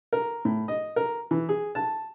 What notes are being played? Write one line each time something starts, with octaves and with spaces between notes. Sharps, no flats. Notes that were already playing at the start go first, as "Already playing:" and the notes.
A#4
A2
D#5
A#4
E3
G#4
A5